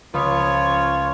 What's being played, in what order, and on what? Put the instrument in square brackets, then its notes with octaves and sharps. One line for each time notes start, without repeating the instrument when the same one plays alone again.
[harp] C#2 B5 D#6 [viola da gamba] F3 C#4 C#5 [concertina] F4